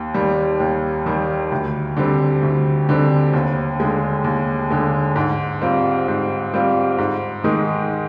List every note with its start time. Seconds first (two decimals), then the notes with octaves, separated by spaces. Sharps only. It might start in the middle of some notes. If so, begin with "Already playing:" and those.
Already playing: D#2
0.14 D#3 G3
0.60 D#2
1.06 D#3 G3
1.52 D2
1.97 D3 G3 C4
2.43 D2
2.89 D3 G3 C4
3.33 D#2
3.80 D3 G#3
4.24 D#2
4.70 D3 G#3
5.16 G#2
5.62 G3 C4 F4
6.08 G#2
6.54 G3 C4 F4
6.98 G#2
7.44 D#3 G#3 D#4